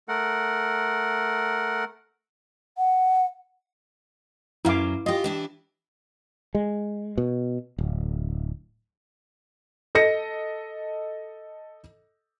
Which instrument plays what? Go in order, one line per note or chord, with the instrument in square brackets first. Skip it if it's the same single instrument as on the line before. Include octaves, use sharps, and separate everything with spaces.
[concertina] A3 A#4 F#5
[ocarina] F#5
[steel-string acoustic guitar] F#2 F#3 [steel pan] E4 F5 D6
[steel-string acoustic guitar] F4 G4 [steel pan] D#5
[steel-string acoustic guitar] E3 D4 E4
[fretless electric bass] G#3
B2
D1
[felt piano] A4 D#5 A#6 C#7